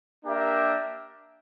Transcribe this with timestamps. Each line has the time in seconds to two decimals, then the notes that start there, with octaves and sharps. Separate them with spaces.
0.25 A#3 D4 G4 A#4 E5